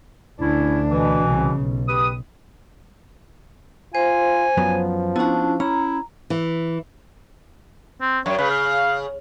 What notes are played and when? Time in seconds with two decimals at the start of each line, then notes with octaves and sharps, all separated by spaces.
0.40 D2 C#4 D4 E4
0.91 B2 E3
1.26 C2 C#3
1.56 B1
1.88 G4 B4 D#6
3.95 F4 C5 G#5
4.57 F#2 F3 F#3 B3
5.16 B3 C#4 D4 E4 F#5
5.60 C#4 E4 A#5
6.30 E3
8.01 C4
8.26 F#2 C#5
8.38 C#3 B4
8.50 F5